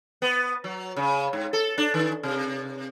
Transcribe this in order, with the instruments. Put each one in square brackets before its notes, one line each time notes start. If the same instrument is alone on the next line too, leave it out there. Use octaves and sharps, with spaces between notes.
[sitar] B3
F#3
C#3
G#2
A4
D4
D#3
C3